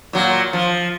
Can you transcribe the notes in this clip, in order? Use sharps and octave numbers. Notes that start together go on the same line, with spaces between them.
A#2 F#3
F3